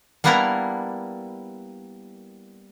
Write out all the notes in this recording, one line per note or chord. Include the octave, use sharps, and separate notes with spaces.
G3 A#3 B3 D4 E4 A#4